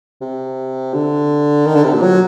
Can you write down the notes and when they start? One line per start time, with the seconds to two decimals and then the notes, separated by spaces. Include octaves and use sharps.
0.22 C3
0.94 D3
1.66 D#3
1.75 D3
1.84 C3
1.94 A#2
2.02 F#3